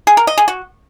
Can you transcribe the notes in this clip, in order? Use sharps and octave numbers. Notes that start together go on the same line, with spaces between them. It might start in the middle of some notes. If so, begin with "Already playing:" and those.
G#4
A#4
D#5
G#4
F#4